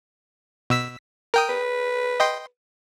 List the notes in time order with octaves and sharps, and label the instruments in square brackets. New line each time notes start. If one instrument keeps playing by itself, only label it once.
[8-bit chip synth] B2 E6 B6
A#4 G5 D#6
[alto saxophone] B4
[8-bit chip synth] D#5 G5 C6